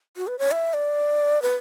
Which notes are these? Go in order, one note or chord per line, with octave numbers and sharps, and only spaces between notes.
F#4
B4
C#5
E5
D5
B4